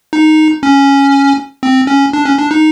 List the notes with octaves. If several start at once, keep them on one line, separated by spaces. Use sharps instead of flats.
D#4
C#4
C4
C#4
D4
C#4
D4
D#4